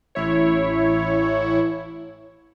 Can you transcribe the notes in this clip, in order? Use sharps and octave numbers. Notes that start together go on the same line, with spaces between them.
A1 E4 C#5